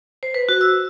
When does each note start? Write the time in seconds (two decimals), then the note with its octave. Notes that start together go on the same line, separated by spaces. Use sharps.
0.23 C5
0.34 B4
0.49 F#4
0.61 E6